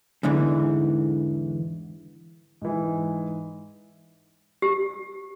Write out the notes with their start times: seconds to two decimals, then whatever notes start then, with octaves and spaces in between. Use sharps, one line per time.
0.23 E2 G#2 D3 E3
2.62 G#2 E3
4.62 G4